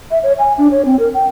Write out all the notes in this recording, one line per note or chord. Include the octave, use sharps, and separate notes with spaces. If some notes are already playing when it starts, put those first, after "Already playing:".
E5
C#5
G#5
D4
C#5
C4
A#4
G5